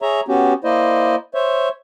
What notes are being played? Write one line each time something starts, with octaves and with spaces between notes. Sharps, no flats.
G#4 C#5 E5 A#5
B3 C#4 F#4 G4
A#3 E4 C5 D5 D#5
C5 C#5 E5